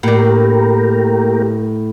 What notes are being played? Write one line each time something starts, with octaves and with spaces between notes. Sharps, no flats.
A2 A#3 D4 G4 A#4